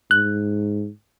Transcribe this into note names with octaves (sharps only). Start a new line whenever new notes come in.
G#2 F#6